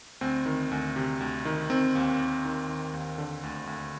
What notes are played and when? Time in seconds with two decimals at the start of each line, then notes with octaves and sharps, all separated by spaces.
0.21 D2 C4
0.46 D#3
0.71 D2
0.96 C3
1.20 D2
1.45 D#3
1.70 D#3 C4
1.95 D#2
2.20 D#2
2.45 D#3
2.69 D#3
2.93 D#2
3.18 D3
3.43 D2
3.67 D2